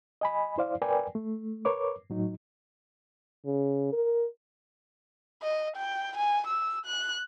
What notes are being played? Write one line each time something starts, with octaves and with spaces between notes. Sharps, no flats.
D#5 G#5 B5
E4 C5 D5 F5
A#4 B4 D5 G5 G#5
A3
A#4 B4 C#5 D6
A2 F#3 D#4
C#3
A#4
D#5
G5
G#5
E6
F#6